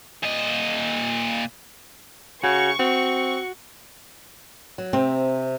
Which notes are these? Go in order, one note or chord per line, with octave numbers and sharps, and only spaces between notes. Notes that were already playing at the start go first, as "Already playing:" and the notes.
A#2 D#5
C#3 F#4 C#6
C4 F#4
F#3
C3 C4